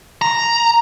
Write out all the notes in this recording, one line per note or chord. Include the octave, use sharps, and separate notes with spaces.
A#5